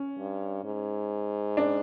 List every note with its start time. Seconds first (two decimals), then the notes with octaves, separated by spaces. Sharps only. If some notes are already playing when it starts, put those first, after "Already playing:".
Already playing: C#4
0.18 G2
0.64 G#2
1.57 D4